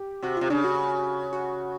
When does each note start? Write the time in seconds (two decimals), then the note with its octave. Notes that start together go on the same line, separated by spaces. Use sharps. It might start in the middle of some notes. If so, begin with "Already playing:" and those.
Already playing: G4
0.22 C3 F#4
0.37 C3 F4
0.50 C#3 D4
0.64 F#4
1.33 F#4